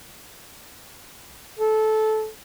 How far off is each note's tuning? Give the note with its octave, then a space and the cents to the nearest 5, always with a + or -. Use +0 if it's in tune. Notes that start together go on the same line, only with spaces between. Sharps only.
A4 -15